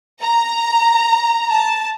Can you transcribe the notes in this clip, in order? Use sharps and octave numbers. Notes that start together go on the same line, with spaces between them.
A#5
A5